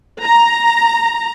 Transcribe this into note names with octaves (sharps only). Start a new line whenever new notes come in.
A#5